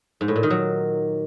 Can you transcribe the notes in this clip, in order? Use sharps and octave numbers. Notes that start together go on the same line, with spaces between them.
G#2
A2
A#2
D#3
F#3